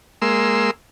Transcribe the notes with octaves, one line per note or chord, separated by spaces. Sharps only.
G#3 A#3 C6 E6